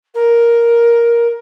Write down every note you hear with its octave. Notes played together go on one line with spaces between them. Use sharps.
A#4